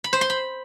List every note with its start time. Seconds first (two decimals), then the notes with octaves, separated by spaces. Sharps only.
0.04 B5
0.13 C5
0.21 C6
0.30 B5